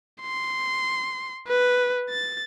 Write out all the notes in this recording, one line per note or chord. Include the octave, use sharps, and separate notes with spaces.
C6
B4
A6